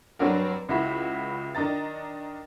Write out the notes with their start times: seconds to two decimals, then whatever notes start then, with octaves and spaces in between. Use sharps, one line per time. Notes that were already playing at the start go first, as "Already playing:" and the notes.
0.19 G2 F#3 C4 D4 F#4 A#4
0.69 C#2 E4 F#4 E5 B5
1.55 D#3 D4 D#5 A#5 A6